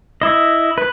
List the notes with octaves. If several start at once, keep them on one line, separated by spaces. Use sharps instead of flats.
E4 D#5
B4